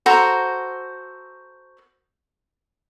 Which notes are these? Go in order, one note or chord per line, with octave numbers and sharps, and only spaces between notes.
F#4 A4 C5 A#5